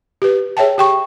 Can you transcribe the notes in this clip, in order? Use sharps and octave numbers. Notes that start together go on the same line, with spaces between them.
G4 B4
G#4 C#5 E5 G5 A5
G4 G5 C#6